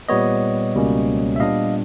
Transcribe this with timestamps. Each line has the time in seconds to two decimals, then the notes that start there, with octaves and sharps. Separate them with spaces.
0.09 A#2 G3 B3 C#5 D#5
0.75 C#2 B2 G3 A#3 C#4
1.36 E5
1.40 A#2 G3 B3 D4 D#5 F5